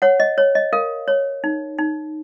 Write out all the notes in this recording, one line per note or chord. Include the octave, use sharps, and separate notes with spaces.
C#5 F#5
D#5
C#5
D#5
A#4 F5
C#5
D#4
D#4